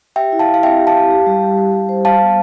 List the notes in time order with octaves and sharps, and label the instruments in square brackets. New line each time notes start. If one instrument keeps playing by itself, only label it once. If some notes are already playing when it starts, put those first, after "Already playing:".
[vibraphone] G4 [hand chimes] E5 G5
[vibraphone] E4
[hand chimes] F5 A5
[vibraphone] E4
[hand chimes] F5
[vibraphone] C4 [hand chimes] E5 G5
[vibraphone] G4
[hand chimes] F5 A5
[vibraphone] G4
G4
G3
G4
G3
G4
C5
[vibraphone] G3 [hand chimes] F5 A5
[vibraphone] B3